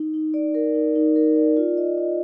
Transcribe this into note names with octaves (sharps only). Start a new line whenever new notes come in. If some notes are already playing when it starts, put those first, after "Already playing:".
Already playing: D#4
D#4
D5
A#4
D#4
D#4
A#4
D5
F4
D#5
D#5